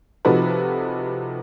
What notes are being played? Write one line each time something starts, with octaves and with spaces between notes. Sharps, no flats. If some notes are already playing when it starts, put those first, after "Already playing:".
C3 F3 D#4 F#4 A4 B4